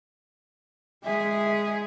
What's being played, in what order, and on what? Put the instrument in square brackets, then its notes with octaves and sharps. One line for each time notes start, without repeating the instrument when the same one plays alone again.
[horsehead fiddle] G#3 G#4 [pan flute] E5